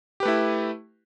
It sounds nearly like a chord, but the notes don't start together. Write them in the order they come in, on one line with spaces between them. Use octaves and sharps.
G4 B4 A3 E4